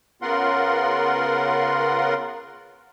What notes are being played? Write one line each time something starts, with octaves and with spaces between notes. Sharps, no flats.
C#3 B3 F4 A#4 F#5 C6